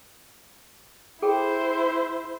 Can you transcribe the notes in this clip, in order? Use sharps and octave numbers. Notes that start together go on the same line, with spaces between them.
E4 G#4 A4 C5 G5